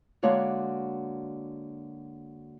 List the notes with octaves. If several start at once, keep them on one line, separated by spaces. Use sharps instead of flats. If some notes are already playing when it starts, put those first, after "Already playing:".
D3 G#3 A#3 F#4 C#5 D5